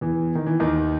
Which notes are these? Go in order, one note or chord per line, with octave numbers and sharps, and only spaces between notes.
E2 E3
D#3
E3
D#2 D#3